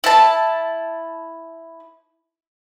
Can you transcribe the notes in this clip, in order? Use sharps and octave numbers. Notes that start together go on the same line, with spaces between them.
E4 A5